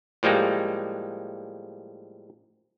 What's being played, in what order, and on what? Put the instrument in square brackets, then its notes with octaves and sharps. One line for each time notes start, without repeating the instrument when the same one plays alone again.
[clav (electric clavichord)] A2 F3 G3 G#3 A#3